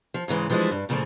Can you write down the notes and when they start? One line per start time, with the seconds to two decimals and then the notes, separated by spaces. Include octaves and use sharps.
0.14 F3
0.28 G#2 C#3 E3 G#3
0.50 E3 F3 G3 G#3 D4 E4
0.71 G2
0.89 A#2 C#3 E3 F3 A3